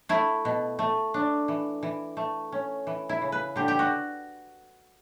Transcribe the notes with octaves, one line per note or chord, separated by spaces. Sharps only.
A3 E4
B2
A3
D4
E3
E3
A3
C#4
E3
E4
C#3
B4
D3 G4
G4
F#4